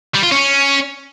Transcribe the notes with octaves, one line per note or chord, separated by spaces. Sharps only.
G3
F4
C#4